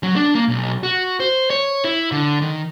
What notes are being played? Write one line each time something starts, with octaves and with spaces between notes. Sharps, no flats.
F#3
D4
A#3
B1
F#4
C5
C#5
E4
D3
D#3